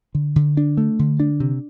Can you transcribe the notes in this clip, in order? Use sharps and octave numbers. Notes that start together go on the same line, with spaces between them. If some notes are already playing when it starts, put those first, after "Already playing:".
D3
D3
D4
A3
D3
D4
C3